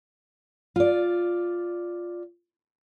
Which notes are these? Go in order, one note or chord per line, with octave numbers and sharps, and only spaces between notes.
F4 D5